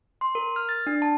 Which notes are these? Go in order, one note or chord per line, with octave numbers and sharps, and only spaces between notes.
C6
A#4
F6
A6
D4
A5